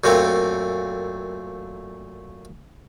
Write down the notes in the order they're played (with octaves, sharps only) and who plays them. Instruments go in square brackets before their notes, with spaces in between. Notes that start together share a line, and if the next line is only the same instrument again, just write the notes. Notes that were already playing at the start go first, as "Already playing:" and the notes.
[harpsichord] F#2 A#2 A3 C4